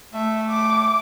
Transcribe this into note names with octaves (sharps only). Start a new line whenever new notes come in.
A3 E5
D6